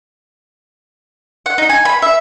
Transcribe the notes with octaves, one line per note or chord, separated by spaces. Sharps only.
F#5
D#4
G#5
B5
E5